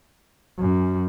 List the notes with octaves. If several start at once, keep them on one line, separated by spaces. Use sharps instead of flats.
F#2